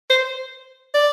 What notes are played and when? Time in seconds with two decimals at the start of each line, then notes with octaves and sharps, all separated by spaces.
0.10 C5
0.94 D5